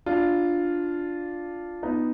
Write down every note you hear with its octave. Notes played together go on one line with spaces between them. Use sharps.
D4 F4
B3 D#4